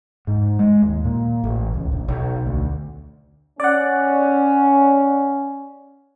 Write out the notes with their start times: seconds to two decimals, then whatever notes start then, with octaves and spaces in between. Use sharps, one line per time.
0.27 G#2
0.59 G#3
0.82 D#2
1.05 A#2
1.44 A1
1.74 C#2
1.92 A#1
2.08 B1
2.46 D2
3.60 C#4 D5 F#5